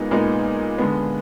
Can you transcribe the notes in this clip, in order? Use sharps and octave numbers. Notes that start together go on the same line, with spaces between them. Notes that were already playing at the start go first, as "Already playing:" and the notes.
Already playing: A#2 G#3 B3 D#4
A#2 G#3 B3 D#4
D3 G#3 B3